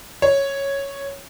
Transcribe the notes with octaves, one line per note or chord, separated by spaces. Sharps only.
C#5